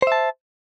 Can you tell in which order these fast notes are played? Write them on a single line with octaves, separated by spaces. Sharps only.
C5 E5 A5